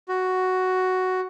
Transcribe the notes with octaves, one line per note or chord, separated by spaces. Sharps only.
F#4